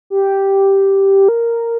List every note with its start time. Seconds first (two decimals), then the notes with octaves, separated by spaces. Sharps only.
0.10 G4
1.28 A#4